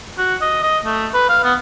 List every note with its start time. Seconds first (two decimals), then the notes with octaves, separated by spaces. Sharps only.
0.18 F#4
0.42 D#5
0.63 D#5
0.85 A3
1.14 B4
1.29 F5
1.44 B3